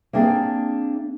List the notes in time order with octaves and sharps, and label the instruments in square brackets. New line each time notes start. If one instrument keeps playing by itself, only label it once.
[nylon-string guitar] A#3 C4 D4 G#4